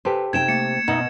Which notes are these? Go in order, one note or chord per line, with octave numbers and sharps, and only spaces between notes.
G4 A4 B4 C5
C3 D#4 G5 G#6 E7
A3 A#3 A6 C#7
B2 D#4 D#5 E5 F#5